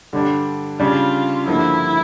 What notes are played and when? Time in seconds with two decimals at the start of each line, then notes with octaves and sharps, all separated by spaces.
0.13 G2 D3 G3 D4
0.80 C#3 G3 D4 F4
1.47 G2 D3 F3 A#3 E4